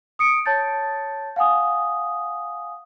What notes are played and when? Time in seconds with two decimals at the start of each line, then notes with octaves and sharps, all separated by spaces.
0.19 D#6 C#7 D7
0.46 C#5 A5 G6 A6
1.36 F5 F#5 G#5 D#6